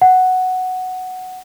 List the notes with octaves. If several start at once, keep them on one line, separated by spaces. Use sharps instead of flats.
F#5